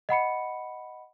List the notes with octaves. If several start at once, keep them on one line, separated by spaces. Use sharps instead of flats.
D#5 F#5 B5 C#7